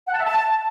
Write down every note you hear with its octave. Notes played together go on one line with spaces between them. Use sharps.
F#5
A5
E5
A5